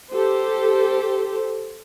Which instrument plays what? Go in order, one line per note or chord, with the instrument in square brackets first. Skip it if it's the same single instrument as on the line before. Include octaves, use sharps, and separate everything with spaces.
[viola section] G4 A4 C5